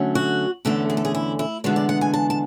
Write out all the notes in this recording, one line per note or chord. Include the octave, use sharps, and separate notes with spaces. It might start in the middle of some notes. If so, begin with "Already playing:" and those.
Already playing: D3 F#3 A3 C#4
F#4
E2 D3 A3 C#4 A4
G#4
A4
G#4
E4
E4
E2 D3 G#3 B3 D4 F#4
D5
F#5
G#5
A5
A5